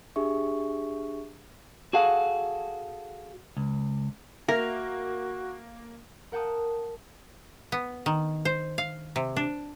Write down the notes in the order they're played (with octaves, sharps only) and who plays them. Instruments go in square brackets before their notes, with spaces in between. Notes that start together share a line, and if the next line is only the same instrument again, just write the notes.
[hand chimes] D4 G4 G#4 E5 C#6
[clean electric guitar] F#4 G#4 A4 F5 F#5
C#2
[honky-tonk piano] A#3 [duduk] F#4 [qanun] A#4 [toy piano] E5
[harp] A#4 F#5 G5 A5 D#6
[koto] B3
D#3
C5
F5
C3
D4